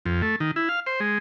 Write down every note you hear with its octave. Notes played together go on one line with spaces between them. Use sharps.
F2
A3
D#3
E4
F5
C5
G#3